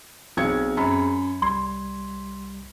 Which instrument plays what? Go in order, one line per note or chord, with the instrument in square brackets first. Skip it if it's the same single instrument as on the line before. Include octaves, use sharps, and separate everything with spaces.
[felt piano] B1 G#6 C#7 [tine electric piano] C4 G#4
[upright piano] F#2 [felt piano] B5
[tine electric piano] C2 G3 G#6 [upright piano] C6